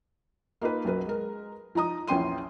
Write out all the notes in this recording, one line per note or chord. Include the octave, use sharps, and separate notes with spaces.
A#3 D#4 F4 B4
B1 F#2 A#4 B4
G#3 A#4
F3 D#4 A#5 D#6
A#1 E2 C#4 G5 C6 D#7